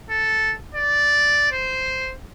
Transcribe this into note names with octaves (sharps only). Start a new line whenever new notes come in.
A4
D5
C5